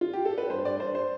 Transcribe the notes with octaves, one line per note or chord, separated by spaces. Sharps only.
F4
G4
A4
B4
G2 C5
G2 D5
G2 C5
C5